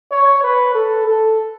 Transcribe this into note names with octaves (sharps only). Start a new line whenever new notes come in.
C#5
B4
A4
A4